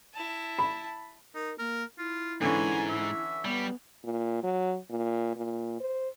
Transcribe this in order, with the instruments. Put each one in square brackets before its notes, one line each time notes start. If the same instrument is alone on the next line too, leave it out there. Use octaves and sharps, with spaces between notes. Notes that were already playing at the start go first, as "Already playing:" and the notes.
[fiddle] E4 A5
[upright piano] B5
[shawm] D#4 [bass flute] A#4
[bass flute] A#3 [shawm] A#4
[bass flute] E4 [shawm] F4
[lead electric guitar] G#2 [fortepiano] D3 E3 C#4 [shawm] G#5
[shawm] E5
[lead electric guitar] G3 [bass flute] B3
[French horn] A#2
F#3
A#2
A#2
C5